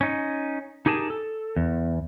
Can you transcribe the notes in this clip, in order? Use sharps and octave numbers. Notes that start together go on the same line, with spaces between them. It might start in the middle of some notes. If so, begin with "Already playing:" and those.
C#4 D#4
D#4 G4 G#4 A#4 A5
A4
E2